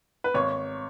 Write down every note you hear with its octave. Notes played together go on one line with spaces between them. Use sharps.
B4
G#1 C#5